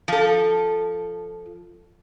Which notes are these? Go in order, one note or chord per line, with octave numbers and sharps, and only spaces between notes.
F3 A4